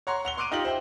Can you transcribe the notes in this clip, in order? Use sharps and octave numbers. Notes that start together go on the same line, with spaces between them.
C#5 F#5 A#5 C6 C#6
F#5 F7 G7
C6 D6 F#6 D7 D#7 F7
D#4 F4 G4 A#6 F#7
C5 E5 G5